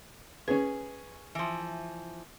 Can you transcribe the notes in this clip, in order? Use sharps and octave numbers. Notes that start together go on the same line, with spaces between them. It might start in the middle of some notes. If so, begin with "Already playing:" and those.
C#4 G#4 B4
E3 F3